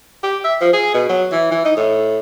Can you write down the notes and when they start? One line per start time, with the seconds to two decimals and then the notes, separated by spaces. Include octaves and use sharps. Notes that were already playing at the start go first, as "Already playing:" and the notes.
0.23 G4
0.44 E5
0.61 F3
0.73 G#4
0.94 B2
1.09 F#3
1.32 E3
1.51 E3
1.65 D#4
1.77 A2